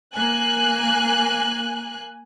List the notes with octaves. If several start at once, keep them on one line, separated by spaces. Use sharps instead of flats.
A#3 G#5 F#6